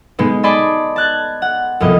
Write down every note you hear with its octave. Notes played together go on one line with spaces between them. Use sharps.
B2 G#3 B3 D#4
D5 D#5 G#5 A5 B5 C6
A5 F#6 G#6
F#5
C2 F2 B2 D#5